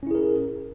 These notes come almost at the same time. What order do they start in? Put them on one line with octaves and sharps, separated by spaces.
C#4 E4 G#4 A#4